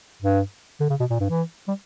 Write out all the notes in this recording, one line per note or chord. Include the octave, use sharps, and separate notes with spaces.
G2
D3
C#3
B2
A#2
G2
E3
G3